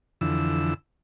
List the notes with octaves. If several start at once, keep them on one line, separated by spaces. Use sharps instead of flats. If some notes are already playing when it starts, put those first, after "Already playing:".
F2 D3 E3 E6